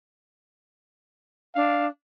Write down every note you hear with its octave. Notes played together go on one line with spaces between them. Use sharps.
D4 F5